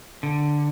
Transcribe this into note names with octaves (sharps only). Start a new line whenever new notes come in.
D3